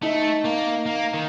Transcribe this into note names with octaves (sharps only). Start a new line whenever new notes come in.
A3 D#4
A#3
A#3
D#3